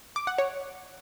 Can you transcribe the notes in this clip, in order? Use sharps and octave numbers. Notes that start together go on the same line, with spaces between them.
D6
F#5
C#5